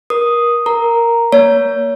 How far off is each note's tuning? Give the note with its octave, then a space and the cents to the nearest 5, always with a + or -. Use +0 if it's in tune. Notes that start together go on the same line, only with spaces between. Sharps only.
A#4 +25 D#6 +0
A#4 +0 A#5 +0
A#3 +0 C#5 +25 A#5 +10